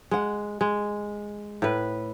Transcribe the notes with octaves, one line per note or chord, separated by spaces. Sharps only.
G#3 F#5
G#3
A2 B4